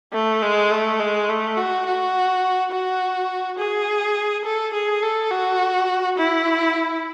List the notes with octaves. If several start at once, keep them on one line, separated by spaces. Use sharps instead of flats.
A3
G#3
A3
G#3
A3
F#4
F#4
F#4
G#4
A4
G#4
A4
F#4
E4